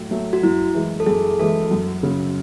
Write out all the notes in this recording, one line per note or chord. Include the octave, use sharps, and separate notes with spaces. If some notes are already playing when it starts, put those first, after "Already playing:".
Already playing: A2 F#3 A3
F#3 A3
F#4
F#2 E4
E3 G#3
A4
F#2 G#4
E3 G#3 A4
F#2
C#3 F#3